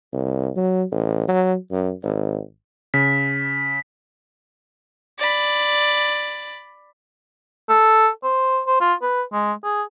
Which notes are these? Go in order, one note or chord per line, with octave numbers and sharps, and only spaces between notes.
C2
F#3
A1
F#3
F#2
G#1
C#3 B6
D5 B5
A4
C5
C5
F4
B4
G#3
G#4